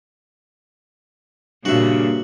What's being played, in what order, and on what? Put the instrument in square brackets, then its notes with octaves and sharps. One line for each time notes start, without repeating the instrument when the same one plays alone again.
[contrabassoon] G2 [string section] A#2 C#3 [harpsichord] F#4 E5